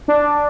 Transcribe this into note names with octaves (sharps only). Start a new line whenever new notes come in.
D4